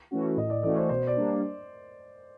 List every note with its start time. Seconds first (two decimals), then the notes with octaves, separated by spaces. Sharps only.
0.11 E3 A3 C#4 F#4
0.37 A2 D#5
0.50 D5
0.63 E3 A3 C#4 F#4 D5
0.77 C5
0.89 B2 C5
1.07 D5
1.16 G3 A#3 D4